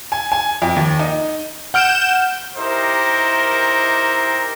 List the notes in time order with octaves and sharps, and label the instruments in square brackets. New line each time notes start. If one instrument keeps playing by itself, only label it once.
[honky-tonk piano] G#5
G#5
F2
D#2
D#4
[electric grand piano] F#5 F6 D7 [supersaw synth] G6 E7
[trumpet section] D#4 E4 G4 A#4 C5